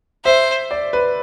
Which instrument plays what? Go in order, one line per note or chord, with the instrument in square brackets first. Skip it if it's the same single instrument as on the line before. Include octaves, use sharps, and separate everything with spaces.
[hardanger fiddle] C5 [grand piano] E5
[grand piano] D5
B4